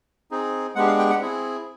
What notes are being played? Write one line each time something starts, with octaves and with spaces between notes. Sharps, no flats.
C4 D#4 G#4
G#3 B3 D4 G4 F#5
F5
G5
F#5
C4 E4 G#4